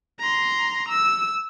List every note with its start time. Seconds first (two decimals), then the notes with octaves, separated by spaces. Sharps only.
0.19 A#5 C6
0.88 E6